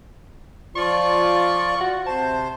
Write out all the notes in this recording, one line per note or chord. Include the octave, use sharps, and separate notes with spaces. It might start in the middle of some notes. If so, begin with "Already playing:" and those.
F3 F4 D5 C#6
F#4
C3 C5 A5